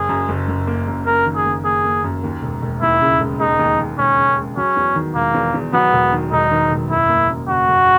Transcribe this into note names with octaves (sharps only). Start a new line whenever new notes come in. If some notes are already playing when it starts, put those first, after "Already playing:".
Already playing: F#1 G#4
F#2
F#1
F#1
A#3
F#2
A#3 A#4
D#3
G#4
F#1
A#3 G#4
A#3
F#2
D#2
E1
E1
D#2 E4
C#3
E1
G#3 D#4
D#2
D#2
E1 C#4
C#3
G#3
F#3 C#4
E2
D#3
E1 A#3
E2
E2
F#3 B3
E1
D#3
E1 D#4
D#3
E1
F#1 E4
A#3
F#2
F#1 F#4
F#1